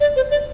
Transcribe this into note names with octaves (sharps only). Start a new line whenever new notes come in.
D5
C5
D5